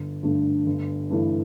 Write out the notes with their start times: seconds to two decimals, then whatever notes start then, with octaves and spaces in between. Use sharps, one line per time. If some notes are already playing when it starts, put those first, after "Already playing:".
Already playing: G1
0.23 G2 D3 A3
0.66 G1
1.10 G2 E3 A3 E4